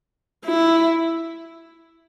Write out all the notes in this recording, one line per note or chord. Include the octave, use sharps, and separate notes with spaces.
E4